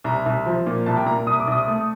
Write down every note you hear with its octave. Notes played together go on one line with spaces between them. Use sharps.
C2 A#5
C2
F3
A#2
C2 A5
G5
A#2 A#5
C2 D#6
D6
C2 D#6
A3